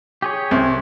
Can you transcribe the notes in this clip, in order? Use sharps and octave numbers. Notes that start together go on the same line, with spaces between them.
G4 G#4 C#5
C2